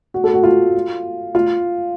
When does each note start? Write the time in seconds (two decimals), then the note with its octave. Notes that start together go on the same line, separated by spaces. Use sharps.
0.14 F#4
0.24 A4
0.34 F#4
0.44 F4
1.35 F4